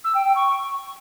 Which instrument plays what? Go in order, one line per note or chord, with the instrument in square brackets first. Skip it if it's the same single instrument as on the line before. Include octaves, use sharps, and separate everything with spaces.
[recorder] E6
G5
G5
C#6